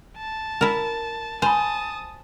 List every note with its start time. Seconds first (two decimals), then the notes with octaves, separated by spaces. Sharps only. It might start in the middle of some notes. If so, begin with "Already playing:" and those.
0.17 A5
0.61 E4 A#4
1.42 C5 G#5 A5 B5 D#6